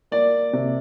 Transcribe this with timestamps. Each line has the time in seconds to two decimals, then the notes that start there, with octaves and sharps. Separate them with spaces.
0.11 A#3 D5
0.53 C3